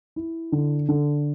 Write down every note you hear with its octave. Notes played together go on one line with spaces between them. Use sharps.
E4
D3
D3